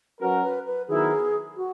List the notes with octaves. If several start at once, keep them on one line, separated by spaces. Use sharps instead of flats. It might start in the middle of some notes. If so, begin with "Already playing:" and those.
F#3 C#4 F#4 A#4 B4
B4
B4
D#3 F#3 B3 E4 G#4 A#4
F#4